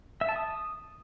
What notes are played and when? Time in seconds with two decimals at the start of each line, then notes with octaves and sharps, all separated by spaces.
0.21 E5
0.29 A5
0.36 D#6